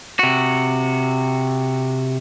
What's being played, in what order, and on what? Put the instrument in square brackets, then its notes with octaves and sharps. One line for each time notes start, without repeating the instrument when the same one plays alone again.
[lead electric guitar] C3 F#4